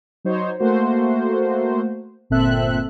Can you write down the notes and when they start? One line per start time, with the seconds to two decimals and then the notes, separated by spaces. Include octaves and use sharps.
0.25 F#3 D#4 C5 C#5
0.60 A3 A#3 F#4 C5
2.30 G1 A#2 C4 A4 E5 F#6